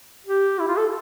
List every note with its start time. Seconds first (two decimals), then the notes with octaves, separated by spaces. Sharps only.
0.27 G4
0.60 E4
0.68 F4
0.77 A4